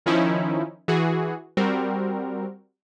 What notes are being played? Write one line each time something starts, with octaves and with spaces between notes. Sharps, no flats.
D#3 F3 C#4 D#4 E4
E3 F#4 G#4
G3 C4 F#4 A#4